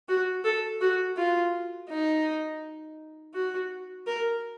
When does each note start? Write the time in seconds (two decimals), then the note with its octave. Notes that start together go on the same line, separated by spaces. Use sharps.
0.08 F#4
0.44 A4
0.81 F#4
1.17 F4
1.89 D#4
3.34 F#4
4.07 A#4